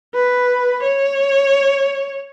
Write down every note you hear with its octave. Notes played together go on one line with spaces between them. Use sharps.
B4
C#5